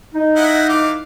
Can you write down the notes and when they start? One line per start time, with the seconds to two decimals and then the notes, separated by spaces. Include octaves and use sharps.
0.14 D#4
0.36 E4 D#5 F#5
0.69 E3 F5 D6